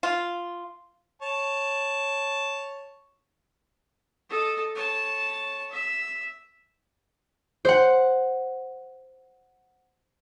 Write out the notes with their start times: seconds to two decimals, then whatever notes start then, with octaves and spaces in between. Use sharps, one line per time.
0.03 F4
1.22 C#5 A5
4.30 A4 D#5
4.75 C#5 A5
5.71 E5
7.65 C5 F#5